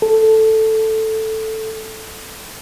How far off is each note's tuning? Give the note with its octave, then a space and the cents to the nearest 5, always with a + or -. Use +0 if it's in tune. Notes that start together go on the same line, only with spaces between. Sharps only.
A4 +0